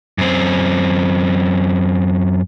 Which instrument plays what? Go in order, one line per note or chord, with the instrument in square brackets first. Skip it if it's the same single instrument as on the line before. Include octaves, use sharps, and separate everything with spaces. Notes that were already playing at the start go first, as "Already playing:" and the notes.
[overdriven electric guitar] F#2 C4